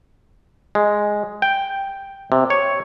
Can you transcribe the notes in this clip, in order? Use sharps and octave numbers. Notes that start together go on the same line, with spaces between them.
G#3
G5
C3
C#5